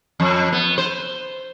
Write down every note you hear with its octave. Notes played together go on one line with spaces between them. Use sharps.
F2
B3
C5